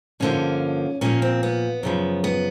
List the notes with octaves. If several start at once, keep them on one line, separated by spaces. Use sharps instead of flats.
G2 D3 F3 A#3 C#4
A#2 F3 A#3 C#4
C4
B3
F#2 C#3 F3
B3